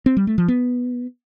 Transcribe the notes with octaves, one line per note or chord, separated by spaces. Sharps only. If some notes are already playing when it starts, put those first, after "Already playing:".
C4
G3
A3
F3
B3